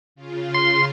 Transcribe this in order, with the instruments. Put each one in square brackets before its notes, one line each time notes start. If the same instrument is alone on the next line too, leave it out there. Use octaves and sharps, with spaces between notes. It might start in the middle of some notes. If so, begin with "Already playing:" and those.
[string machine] C#3 F4
[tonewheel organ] C6